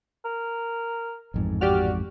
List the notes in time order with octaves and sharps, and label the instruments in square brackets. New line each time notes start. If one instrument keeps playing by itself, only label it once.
[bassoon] A#4
[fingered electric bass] A1 F2 G#2
[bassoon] F#4 [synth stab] G4 D5 F6